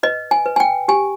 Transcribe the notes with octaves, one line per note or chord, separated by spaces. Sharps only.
B4 D#5
G#5
B4
G#5
G5
G4 G#5